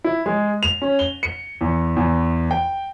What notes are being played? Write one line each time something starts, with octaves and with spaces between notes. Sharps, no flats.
E4
G#3
F7
C#4
G7
C#7
E2
E2
G5